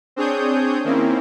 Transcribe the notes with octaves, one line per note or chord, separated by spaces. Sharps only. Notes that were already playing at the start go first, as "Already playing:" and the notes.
C4 D4 G#4 C#5 D#6 G6
D#3 A#3 C4 C#4 E4